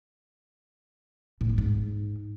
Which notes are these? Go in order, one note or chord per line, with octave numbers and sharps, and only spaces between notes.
A2
G#3
G#2